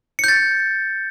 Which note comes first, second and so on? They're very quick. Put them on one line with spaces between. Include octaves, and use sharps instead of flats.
C#7 G6 A6